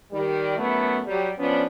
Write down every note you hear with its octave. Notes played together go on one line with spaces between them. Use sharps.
D#3 G3
F#2 A3 B3 E4
F#3 G3 G4
F3 B3 C#4 D4